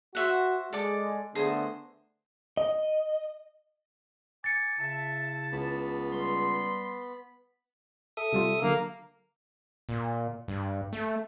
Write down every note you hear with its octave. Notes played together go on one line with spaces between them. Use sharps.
F#4 C5 E5 F#5
G#3 A4 D5 D6
D3 A3 B3 G#4 C5 A#5
D#5
G#5 D6 A6 C#7
C#3 E4 E5 A5
C#2 B3 B5
G3 C6
A4 E5 D#6
C3 G3 F4
D3 F#3 A#3
A#2
G2
A3